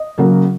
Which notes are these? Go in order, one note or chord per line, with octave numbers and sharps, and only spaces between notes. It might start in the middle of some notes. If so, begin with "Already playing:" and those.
Already playing: D#5
C#3 F#3 A#3